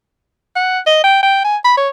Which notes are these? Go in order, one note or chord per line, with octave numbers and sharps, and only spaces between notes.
F#5
D#5
G5
G5
G#5
B5
C#5